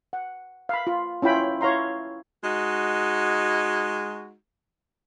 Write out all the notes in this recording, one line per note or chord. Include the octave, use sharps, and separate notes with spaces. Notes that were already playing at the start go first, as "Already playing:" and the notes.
F#5
F5 B5
F4
C#4 E4 F4 G5 B5
E4 C#5 F5 A#5 C6
G#3 D#4 F#4